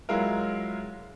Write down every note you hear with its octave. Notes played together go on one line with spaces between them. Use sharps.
F#3 G#3 E4 F4 A#4